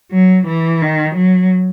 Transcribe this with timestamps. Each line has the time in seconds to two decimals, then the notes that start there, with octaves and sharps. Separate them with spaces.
0.12 F#3
0.47 E3
0.82 D#3
1.16 F#3